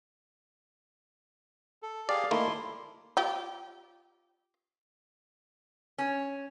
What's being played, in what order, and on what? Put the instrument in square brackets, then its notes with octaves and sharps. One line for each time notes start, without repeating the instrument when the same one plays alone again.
[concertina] A4
[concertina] G4 G#4 F5 [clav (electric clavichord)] D5
[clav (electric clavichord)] D#3 A3 A#3 [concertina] E4 C6
[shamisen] F4 G4
[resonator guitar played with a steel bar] C#4